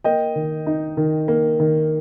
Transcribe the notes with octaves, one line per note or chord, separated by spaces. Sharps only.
A#3 D#5 G5
D#3
D#4
D#3
A#3
D#3